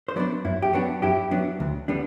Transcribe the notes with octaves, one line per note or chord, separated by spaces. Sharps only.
C5
F#3 B3 D4 B4 D5
F#2 E4
G4
F#3 B3 D4 F#4
F#2 E4 G4
F#3 B3 D4
D2
D3 G3 B3 D4